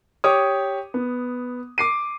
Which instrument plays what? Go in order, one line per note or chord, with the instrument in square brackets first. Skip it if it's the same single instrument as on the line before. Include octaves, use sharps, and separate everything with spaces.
[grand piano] G4 C#5 D6 D#6
B3
D6 C7 D#7